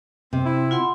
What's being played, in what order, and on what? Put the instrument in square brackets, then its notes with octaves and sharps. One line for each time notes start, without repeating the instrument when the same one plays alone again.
[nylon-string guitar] C3 [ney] C4
[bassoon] E4
[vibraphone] F4 F#5 C6